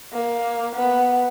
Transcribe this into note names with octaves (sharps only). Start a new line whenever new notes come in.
A#3
B3